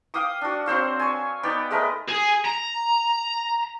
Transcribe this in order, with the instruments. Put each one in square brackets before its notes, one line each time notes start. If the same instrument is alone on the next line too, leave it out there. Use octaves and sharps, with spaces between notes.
[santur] F5 G5 D6 D#6
D4 F#4
F#3 C4 C5 F5
C#5 G#5
B3 D#4 D5 G5
G#3 A3 A#4 B4
[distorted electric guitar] G#4
A#5